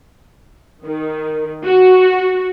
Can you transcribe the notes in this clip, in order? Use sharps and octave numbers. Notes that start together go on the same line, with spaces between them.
D#3
F#4